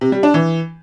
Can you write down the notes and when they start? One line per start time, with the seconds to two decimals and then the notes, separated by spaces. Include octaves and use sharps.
0.01 C3
0.12 G3
0.23 D4
0.34 E3